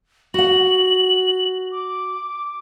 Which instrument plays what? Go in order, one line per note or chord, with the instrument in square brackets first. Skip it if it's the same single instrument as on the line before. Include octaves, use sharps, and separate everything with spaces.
[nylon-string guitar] F#4 F#5 [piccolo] F#7
[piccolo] D6